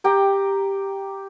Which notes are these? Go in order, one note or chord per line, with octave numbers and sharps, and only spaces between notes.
G4 G5 A#5